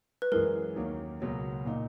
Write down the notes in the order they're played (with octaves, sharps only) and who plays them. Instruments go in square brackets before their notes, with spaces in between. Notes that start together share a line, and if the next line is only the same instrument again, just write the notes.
[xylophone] B4
[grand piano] F#2 E3 G#3 [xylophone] A#4
[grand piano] D#2 D#3 F#3 A#3 C#4
C#2 B2 F#3 A#3
A#2 A#3 D#4